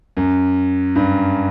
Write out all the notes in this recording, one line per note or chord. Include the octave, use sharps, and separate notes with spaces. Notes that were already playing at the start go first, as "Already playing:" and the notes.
F#2
G2